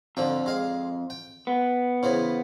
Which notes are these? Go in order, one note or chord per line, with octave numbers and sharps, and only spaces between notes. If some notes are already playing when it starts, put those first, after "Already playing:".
F2 D3 F3 G5
G#3 F5
G5
B3
C#3 E3 C5